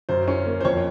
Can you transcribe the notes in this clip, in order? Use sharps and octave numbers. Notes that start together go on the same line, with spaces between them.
F#2 C5
C#4
A#3
C5
F2 C#5